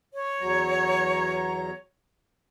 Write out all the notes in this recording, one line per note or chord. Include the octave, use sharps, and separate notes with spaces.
C#5
E2 F#3 A#5